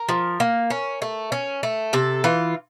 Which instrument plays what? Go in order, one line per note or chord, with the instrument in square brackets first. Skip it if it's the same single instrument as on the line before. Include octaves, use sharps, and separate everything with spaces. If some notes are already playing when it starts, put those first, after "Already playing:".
Already playing: [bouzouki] A#4
F3
A#3
C#4
A3
C#4
A3
C3 A4
E3 F4